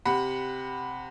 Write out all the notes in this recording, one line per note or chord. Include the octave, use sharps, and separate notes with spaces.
C3 F#5 B5